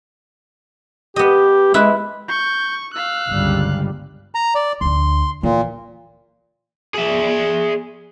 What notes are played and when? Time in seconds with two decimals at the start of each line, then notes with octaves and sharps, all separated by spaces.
1.16 B3 G4 D#5
1.74 G#3 E4 B4
2.28 C#6 G6
2.94 F5 E6 F#6
3.32 G1 C#2 G3
4.35 A#5
4.55 D5
4.81 D2 D4 C6
5.43 A#2 E3
6.94 G#4 E5